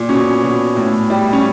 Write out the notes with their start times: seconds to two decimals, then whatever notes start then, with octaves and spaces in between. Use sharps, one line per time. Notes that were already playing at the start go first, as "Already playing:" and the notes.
Already playing: A#2
0.09 B2 C#4
0.44 B2
0.76 A2
1.10 G3
1.33 C#4